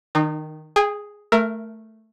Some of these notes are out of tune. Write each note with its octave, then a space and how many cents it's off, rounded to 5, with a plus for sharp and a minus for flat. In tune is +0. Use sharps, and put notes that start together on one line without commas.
D#3 +0 D#4 -35
G#4 +0 G5 +45
A3 +0 A#4 +0 E5 +30